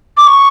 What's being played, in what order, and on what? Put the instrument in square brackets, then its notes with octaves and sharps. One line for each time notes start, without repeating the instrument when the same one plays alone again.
[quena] D6
C#6